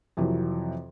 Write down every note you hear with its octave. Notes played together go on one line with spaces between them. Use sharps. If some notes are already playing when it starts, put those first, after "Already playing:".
F2 C3 E3 F#3